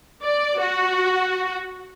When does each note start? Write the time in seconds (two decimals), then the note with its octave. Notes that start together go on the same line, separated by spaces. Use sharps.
0.23 D5
0.59 F#4